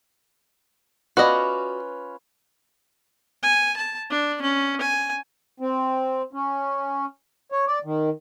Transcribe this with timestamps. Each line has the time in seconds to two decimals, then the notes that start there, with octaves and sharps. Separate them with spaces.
1.17 C#4 F4 F#4 B4 D5 D#5
3.43 G#5
3.77 A5
4.10 D4
4.42 C#4
4.81 G#5
5.60 C4
6.33 C#4
7.52 C#5
7.67 D5
7.84 D#3